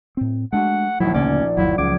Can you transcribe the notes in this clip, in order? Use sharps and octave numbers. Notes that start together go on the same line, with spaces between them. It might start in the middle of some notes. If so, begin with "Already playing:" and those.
A2 C4
G#3 A3 D4 F#4 F#5
A#1 D#2 F#3 E4
D2 C#3 A#3 C#4 D5
G1 D#2 F3 F#3 E4
C#2 C#3 D6 G#6